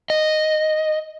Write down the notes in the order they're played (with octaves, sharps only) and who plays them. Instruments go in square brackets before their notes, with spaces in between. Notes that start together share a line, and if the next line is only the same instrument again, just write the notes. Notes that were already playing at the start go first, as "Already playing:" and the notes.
[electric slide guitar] D#5